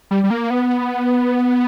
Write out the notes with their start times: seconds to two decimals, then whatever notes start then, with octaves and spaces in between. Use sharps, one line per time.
0.11 G3
0.24 G3
0.30 A#3
0.50 B3